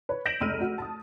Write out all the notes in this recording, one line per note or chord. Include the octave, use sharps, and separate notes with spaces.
B4 C#5
G6 A#6 B6 D7 E7 F#7
F1 C#2 E6 F6 D#7
F#4
A5 D#6